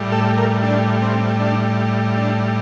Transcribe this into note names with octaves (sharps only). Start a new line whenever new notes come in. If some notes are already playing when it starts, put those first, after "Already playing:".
Already playing: A2 G3
A4
A#4
D4
C4
D4
D4